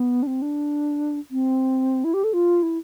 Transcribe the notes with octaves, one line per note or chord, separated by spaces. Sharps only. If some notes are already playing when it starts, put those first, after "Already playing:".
Already playing: B3
D4
C4
D4
C4
E4
G4
A4
F4
E4